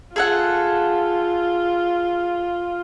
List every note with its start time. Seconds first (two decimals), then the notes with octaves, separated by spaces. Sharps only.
0.16 F4 G#4 A4 F#5